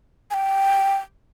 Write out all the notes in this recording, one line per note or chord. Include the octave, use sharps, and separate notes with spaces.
G#5
G5